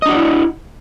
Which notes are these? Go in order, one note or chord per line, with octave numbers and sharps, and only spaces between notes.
D4 E4 F#4 D5 D#5